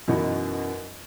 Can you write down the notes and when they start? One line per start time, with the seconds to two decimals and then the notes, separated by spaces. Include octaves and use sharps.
0.08 F#2 B2 E3 D#4 F#4